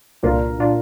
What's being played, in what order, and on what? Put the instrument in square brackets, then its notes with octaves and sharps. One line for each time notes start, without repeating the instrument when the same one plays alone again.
[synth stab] C2 A#2 A#3 D4 F4 [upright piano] A#4
[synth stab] A#2 A#3 D4 F4